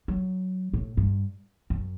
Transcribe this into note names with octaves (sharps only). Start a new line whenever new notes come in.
F#3
A2
G2
F#2